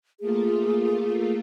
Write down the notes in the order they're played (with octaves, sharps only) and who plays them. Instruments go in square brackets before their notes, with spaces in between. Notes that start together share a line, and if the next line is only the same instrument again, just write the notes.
[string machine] A3 A#3 F4 [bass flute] G#4